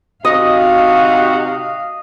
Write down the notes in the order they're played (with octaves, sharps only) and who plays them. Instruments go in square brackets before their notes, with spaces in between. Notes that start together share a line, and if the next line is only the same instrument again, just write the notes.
[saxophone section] C3 D#4 F#4 [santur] D#5 [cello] F5